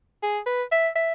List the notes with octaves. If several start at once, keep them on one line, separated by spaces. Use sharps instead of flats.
G#4
B4
E5
E5